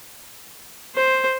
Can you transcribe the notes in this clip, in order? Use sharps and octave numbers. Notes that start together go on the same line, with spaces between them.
C5